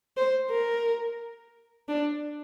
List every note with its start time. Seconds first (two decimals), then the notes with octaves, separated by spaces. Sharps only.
0.17 C5
0.50 A#4
1.88 D4